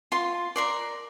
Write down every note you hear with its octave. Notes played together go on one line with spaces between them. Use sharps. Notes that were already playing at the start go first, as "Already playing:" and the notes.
F4 C6
A#4 D5 C6